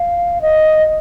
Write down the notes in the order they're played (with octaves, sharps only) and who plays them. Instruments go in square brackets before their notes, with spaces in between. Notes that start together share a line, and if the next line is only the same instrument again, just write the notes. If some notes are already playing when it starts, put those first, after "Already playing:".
Already playing: [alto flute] F5
D#5